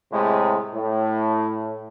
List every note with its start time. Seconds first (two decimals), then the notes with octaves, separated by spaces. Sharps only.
0.12 A2 C3 G#3
0.74 A2